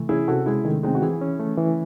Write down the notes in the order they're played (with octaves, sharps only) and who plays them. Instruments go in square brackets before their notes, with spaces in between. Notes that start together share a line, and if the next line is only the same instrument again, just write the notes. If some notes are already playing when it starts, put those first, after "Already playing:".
Already playing: [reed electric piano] C3 E3 A3
[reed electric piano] C#4 [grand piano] E4 G#4
[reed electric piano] C3 [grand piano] F#4 A4
[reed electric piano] G#3 [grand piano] E4 G#4
[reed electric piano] D#3 [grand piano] A3
[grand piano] G#3 C4 [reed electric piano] D#4
[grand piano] F#4
[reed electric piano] E3 [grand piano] E4 G#4
[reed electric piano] C#4
A3
E3